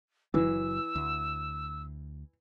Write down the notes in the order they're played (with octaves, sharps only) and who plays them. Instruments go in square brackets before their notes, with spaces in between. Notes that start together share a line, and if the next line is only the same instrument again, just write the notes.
[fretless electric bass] F#1 F#3 [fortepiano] E3 [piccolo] E6
[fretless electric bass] D2